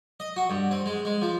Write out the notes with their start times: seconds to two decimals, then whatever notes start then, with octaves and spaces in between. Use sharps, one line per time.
0.20 D#5
0.36 F#4
0.50 G2
0.71 C4
0.86 G#3
1.05 G#3
1.22 F3